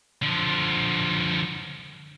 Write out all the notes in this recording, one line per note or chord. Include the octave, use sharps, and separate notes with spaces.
D3 F3